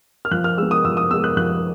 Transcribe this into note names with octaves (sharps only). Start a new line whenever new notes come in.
F6
F3 F#6
F6
G#3 B3 E6
D#6
F3 E6
D#6
G#3 B3 E6
F#6
F3 F#6